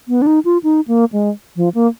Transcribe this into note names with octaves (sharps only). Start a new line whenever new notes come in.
B3
D4
D#4
F4
D#4
A#3
G#3
F3
A#3